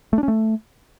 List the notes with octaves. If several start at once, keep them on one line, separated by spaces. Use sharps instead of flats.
A3
D4
C#4
A3